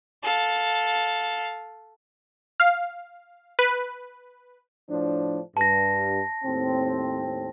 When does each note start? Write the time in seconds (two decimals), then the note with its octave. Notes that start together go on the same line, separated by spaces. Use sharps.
0.23 A4 F5
2.60 F5
3.59 B4
4.90 A2 F3 D4
5.57 G2 A5 A#6
6.45 D#2 A2 C4